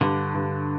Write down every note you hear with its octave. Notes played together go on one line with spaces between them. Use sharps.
G2 D3
G2